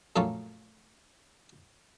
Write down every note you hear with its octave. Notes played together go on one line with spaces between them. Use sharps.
F#2 A#2 F3 A3 A#3 C#4